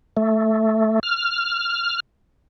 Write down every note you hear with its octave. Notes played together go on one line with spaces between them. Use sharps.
A3
F6